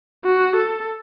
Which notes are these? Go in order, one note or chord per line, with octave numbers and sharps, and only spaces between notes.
F#4
A4